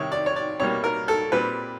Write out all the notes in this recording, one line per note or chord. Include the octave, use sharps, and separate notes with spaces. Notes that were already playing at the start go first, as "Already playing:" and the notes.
Already playing: C2 C3 D#3 C#5
D5
C#5
D5
C2 B2 G3 A#3 C#5
A#4
A4
A#2 G3 C4 B4